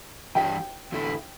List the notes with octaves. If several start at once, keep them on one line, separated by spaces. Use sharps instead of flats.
E3 G3 D4 G4 G5
E2 D3 A3 E4